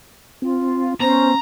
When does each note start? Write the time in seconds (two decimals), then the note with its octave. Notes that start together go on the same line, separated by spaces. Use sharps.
0.42 C4 F4
1.00 B3 C#4 C5 A#5